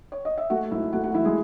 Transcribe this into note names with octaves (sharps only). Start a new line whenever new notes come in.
C#5
D#5
E5
A3 F#4 F#5
G#2 E4 E5
A3 F#4 F#5
F#4 F#5
E3 E4 E5
G#3 G#4